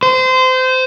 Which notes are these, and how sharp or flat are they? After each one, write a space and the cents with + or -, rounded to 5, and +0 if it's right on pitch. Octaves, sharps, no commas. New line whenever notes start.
C5 -25